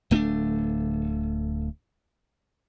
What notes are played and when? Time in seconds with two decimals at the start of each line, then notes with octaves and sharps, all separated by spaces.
0.11 D1 A3 C#4 D4